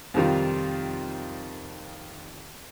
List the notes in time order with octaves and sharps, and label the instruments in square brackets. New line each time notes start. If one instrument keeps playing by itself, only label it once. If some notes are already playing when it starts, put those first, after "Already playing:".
[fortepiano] F2 C3 D#3 G3 F4